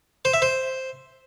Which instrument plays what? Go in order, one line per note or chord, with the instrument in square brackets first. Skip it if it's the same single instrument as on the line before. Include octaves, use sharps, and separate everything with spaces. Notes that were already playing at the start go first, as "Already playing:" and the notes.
[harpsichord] C5
E5
C5